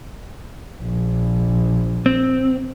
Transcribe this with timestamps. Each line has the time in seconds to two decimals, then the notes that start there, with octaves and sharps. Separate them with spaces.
0.81 A#1
2.06 C4